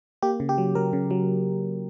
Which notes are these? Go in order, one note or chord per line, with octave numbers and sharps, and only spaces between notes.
A#3 G4
C#3
G4
F#3
F#3 A#4
C#3
F#3